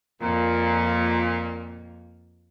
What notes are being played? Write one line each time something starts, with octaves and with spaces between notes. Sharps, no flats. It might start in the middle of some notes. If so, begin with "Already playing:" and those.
F2 A#2 A#3